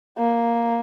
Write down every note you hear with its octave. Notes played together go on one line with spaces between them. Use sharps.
A#3